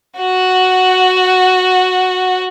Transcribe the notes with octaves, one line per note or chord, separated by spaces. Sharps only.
F#4 F#5